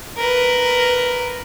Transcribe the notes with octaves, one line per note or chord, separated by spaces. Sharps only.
A#4 B4